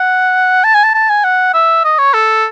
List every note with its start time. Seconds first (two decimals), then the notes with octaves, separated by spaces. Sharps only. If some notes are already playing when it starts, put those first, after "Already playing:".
Already playing: F#5
0.64 A5
0.74 G#5
0.83 A5
0.94 A5
1.09 G#5
1.24 F#5
1.54 E5
1.84 D#5
1.98 C#5
2.14 A4